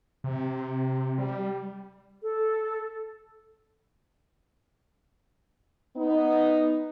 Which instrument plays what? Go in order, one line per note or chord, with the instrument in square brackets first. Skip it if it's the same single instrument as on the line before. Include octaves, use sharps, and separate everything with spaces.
[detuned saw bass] C3
G3
[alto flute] A4
[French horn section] B3 D#4